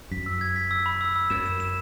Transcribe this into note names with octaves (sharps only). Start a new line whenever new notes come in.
F#2 B6
E6
G#6
B6
E6
B5
E6
E6
F#2 E7
E7
E7